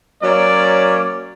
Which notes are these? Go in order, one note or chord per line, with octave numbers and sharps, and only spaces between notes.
F#3 A#3 C#4 C#5 D5